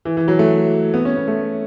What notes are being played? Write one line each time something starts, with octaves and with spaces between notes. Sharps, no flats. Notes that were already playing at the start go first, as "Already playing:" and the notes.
E3
E3
F#3
A3
B3
C#4
B3
A3